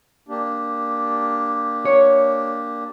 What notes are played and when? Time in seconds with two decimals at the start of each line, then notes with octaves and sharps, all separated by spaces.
0.29 A#3 D4 G4
1.85 C#5